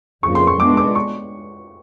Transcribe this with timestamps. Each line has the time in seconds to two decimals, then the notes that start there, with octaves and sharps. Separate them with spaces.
0.23 F2 C#3 F3 A#3 C#6
0.35 C6
0.47 C#6
0.60 G#3 B3 D4 D6
0.77 D6
0.95 C#6